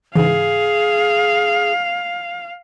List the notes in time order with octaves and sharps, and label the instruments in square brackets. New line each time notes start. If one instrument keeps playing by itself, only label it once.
[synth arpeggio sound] G#2 C#3 E3 [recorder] G#4 [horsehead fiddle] F5